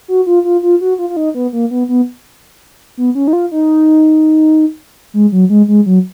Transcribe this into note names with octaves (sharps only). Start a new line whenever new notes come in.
F#4
F4
F4
F4
F#4
F4
F4
D#4
B3
A#3
B3
B3
B3
C#4
D#4
F4
D#4
G#3
F#3
G#3
G#3
F#3